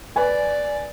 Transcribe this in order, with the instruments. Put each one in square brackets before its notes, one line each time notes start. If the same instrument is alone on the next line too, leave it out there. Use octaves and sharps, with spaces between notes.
[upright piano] B4 G#5 [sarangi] D5